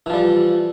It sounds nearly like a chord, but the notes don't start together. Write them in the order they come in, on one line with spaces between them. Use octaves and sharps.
E3 F3 G3